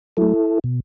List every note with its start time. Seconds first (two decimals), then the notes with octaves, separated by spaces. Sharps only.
0.17 F#3 A3 E4 A4
0.64 B2